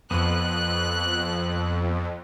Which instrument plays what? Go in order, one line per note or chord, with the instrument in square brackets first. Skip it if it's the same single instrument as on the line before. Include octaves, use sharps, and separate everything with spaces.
[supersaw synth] F2 [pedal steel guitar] F3 B3 [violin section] F#6